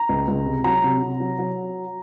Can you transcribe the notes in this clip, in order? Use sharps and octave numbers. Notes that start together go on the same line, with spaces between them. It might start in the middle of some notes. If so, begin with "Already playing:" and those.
Already playing: A#5
C#2
C#2
C3
F#3 A#5
C3
C3
F#3
F#3